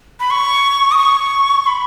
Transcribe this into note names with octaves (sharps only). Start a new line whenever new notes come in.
B5
C#6
D#6
C#6
B5